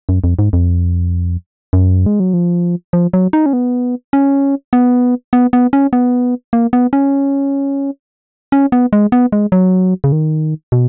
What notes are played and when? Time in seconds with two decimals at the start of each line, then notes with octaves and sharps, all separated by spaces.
0.09 F#2
0.24 F2
0.39 G#2
0.53 F2
1.73 F#2
2.06 G#3
2.20 F#3
2.34 F3
2.93 F3
3.13 F#3
3.33 D#4
3.46 C#4
3.53 B3
4.13 C#4
4.73 B3
5.33 B3
5.53 B3
5.73 C#4
5.93 B3
6.53 A#3
6.73 B3
6.93 C#4
8.52 C#4
8.72 B3
8.93 G#3
9.12 B3
9.32 G#3
9.52 F#3
10.04 C#3
10.12 D#3
10.72 B2